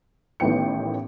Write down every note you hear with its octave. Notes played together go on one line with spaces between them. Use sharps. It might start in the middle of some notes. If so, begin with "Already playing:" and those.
A1 A2 D#3 B3 G5 C#7